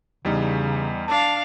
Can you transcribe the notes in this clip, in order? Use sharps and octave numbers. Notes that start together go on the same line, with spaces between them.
E2 C#3 G3 D#4
D4 F5 A5